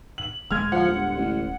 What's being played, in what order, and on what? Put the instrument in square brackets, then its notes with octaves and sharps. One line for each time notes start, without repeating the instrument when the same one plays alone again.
[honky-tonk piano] F#7
[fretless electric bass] D1 G#3 [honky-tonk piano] F6 G#6
[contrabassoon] F3 [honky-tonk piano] F#5
[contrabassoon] G1
A1